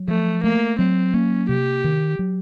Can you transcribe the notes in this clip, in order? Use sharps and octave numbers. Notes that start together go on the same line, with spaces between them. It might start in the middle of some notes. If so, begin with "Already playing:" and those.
Already playing: F#3
F3 A3
A3 A#3
F#3 C4
A#3 C#4
C3 G4
D#3
F#3